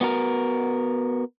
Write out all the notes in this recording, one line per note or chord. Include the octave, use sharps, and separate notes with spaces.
B3 F#4 A#4